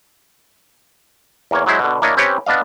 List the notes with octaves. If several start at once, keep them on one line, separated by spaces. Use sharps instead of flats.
E2 A#3 C#5
F#3 G#3 E4 C5
B2 D3
A#3 D4 E4 C#5 D#5
C4 C#4 G4 B4 C#5
B3 D4 D#5 F5